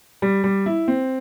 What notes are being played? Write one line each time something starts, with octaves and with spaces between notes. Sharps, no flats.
G3
G3
E4
C4